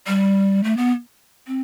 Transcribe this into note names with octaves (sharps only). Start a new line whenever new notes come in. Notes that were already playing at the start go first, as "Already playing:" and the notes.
G3
A3
B3
C4